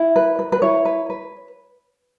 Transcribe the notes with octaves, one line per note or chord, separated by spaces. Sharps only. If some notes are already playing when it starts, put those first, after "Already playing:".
Already playing: E4
B4
B4
B4
E4 C#5
B4
B4